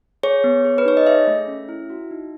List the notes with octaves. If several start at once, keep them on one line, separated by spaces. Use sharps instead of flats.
G#4 C#5
B3
G#4
B4
D#4 C#5
D#5
G#4 E5
A3
C#4
E4
F#4
D#4